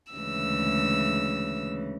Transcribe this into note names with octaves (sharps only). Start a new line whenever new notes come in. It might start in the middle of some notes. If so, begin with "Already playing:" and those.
D2 C#3 E3 G#3 E6